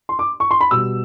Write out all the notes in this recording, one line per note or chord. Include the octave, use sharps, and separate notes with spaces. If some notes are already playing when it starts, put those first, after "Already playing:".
C6
D6
C#6
C6
B5
B2 G3 E6